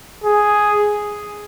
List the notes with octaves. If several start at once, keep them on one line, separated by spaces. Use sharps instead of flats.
G#4